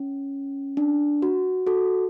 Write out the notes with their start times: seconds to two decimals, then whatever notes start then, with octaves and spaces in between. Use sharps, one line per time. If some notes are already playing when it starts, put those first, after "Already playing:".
Already playing: C#4
0.77 D4
1.22 F#4
1.67 F#4 A4